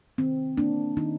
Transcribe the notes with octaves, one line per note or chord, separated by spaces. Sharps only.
D#3 C4
A#3 D4
D#3 D#4